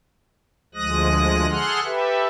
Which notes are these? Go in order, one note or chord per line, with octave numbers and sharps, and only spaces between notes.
D2 F3 G#3 D#6 F#6 A#6
G#4 A4 F#5 C6 F6 F#6
G4 A4 B4 E5